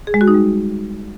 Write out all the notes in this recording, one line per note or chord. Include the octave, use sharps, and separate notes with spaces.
G#4
G#3
F#4
D#4
G3